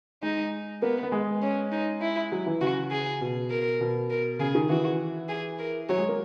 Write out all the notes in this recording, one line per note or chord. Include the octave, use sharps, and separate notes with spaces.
G#3 D#4
A#3 B3
B3
G#3
C#4
D#4
E4
F#3
E3
C#3 F#4
G#4
B2
A#4
B2
A#4
C#3 G#4
D#3
E3 F#4
G#4
A#4
F#3 C#5
G#3
A#3